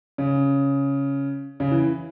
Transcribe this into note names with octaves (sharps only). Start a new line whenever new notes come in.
C#3
C#3
E3